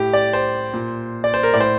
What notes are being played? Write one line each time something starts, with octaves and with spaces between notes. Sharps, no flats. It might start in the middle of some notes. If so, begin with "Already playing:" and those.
Already playing: A2 G4
D5
C5
A#2
D5
C5
A#4
A2 D5
C5